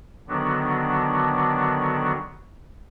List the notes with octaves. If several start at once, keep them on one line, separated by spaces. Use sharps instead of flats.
D3 D#3 F#3 B3 D4 F#4